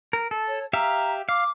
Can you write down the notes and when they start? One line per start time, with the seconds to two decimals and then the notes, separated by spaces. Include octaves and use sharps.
0.13 A#4
0.31 A4
0.47 C#5
0.73 G4 E5 F5 A#5
1.29 F5 D6